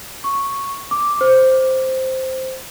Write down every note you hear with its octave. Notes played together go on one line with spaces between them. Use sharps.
C#6
D6
C5